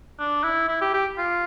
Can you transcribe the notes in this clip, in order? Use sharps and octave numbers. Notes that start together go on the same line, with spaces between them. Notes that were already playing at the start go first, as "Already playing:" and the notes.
D4
E4
E4
G4
G4
F4